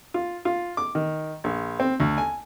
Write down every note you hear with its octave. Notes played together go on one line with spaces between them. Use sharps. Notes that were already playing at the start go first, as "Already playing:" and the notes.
F4
F4
D6
D#3
A#1
C4
D2
G#5